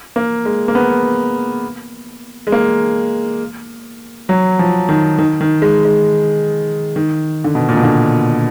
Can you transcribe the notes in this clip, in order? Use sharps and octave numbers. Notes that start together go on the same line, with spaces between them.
A#3
G#3
A#3
B3
G#3
A#3
F#3
F3
D#3
D#3
D#3
G#3
G#3
D#3
D3
B2
A#2
B2
D3